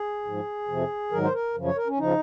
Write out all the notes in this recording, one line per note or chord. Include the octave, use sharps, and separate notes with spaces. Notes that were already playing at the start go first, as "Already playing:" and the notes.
Already playing: G#4
G#2 F3
F2 C3 F3
G#2 D#3 F#3 A#4
C5
A#4
F#2 C#3 F3
C#5
A#4
C#4
C#3 F3 D#4